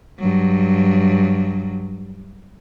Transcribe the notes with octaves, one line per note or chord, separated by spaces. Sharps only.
G2 F#3